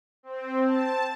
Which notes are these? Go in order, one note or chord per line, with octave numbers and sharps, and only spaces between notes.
C4
A5